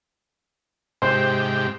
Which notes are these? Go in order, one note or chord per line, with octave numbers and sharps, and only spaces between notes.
G#2 C3 G4 C5